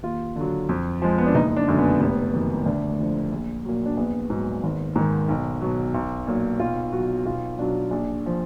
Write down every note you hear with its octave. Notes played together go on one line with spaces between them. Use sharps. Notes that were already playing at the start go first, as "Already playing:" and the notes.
D#2 F4
D3 F#3
F2
F3 G#3
B3
D4
F#1 D#4
D4
F#2 D3 G#3
B3
F1 B3
F2 D#3 F#3
D2 D4
D3 F3
A#1
A#2 F#3
D4
A#1 B3
G#2 F#3
G#1
G#2 D#3
B1
B2 F#3
B1
A#2 F#3
B1 F4
B2 F#3 F#4
B1 F4
B2 F#3 D4
A#1 D4
F3